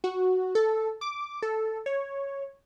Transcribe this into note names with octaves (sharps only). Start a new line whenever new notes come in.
F#4
A4
D6
A4
C#5